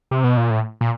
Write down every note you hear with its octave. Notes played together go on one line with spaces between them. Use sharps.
C3
B2
A#2
A2
A#2